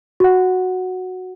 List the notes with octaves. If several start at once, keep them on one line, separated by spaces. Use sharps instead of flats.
F#4 F#5